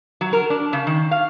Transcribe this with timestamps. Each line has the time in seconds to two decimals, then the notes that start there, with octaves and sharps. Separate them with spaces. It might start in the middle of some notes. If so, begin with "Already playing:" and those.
0.21 F#3
0.33 A#4
0.50 D4
0.73 C#3
0.87 D#3
1.11 F5